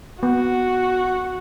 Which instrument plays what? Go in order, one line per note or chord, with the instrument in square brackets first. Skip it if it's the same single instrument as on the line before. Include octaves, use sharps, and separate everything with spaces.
[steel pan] B3 [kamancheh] F#4